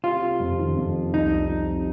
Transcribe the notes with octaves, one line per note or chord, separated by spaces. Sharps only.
C3 F4
C3
F2
D#3
F2
C3
C2 D#4
F3
C3
F3